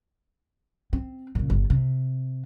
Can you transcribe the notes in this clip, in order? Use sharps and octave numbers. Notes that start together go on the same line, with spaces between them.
C4
A#2 C#3
G1
C3